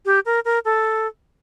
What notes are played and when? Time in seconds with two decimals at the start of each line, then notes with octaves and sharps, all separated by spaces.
0.05 G4
0.26 A#4
0.45 A#4
0.65 A4